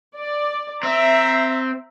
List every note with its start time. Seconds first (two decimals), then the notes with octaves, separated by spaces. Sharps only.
0.15 D5
0.83 C4 E5 A#5